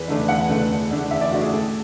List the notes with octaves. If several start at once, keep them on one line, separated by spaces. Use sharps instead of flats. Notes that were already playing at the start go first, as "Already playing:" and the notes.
Already playing: E2 B4
D3 A3 D4
E2 F#5
D3 A3 D4
E2
D3 A3 D4
E2 E5
D5
D3 A3 D4 F#4
G#4
A2 A4